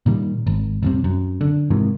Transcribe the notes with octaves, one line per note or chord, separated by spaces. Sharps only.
A#2 D#3 G3
G#1
F1 C2 C3
F#2
D3
G#2 C3 D#3 E3